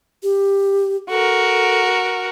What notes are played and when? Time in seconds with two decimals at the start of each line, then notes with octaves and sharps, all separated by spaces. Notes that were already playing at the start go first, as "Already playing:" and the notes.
0.23 G4
1.10 F#4 A4 A#4